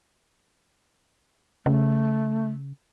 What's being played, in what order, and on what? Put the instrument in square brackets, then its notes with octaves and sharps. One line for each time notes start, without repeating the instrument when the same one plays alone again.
[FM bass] C#3 [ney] A3